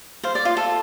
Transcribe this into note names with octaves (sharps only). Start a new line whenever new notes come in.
C5 F5
D5
F4
A4